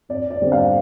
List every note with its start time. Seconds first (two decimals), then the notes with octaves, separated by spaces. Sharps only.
0.09 F2 D5
0.30 D5
0.41 D3 G3 C4
0.52 F5